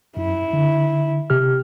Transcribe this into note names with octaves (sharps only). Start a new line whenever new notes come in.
F#2 E4
D3
C3 G4 F6